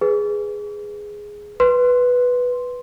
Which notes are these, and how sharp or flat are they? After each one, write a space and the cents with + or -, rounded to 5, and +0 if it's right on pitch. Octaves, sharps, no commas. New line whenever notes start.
G#4 +0 B4 +5
B4 +0 C6 +0